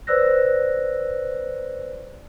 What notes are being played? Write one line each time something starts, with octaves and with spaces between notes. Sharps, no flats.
B4 C5 D5 E6 F#6 A#6